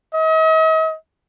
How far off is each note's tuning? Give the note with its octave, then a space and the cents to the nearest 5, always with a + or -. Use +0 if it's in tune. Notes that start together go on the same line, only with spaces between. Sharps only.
D#5 +45